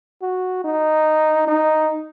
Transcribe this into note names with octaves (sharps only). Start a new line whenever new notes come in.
F#4
D#4
D#4